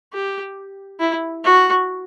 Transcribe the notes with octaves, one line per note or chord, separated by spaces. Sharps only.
G4
E4
F#4